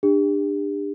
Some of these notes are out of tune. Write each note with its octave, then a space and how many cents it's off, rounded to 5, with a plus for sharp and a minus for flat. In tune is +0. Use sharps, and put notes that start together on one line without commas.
D4 +20 G4 +40